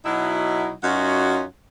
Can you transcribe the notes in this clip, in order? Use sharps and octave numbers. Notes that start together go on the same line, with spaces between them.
B2 F#3 D#4 E4
F#2 C#4 D#4 F4 F#4 F#5